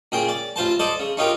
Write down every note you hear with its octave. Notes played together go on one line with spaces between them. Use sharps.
A#2 C#3 G#4 G5
D5
A1 F4 C5 A5
A4 C5 D5 D#5
C#3
C#4 D#4 F4 G4 A#4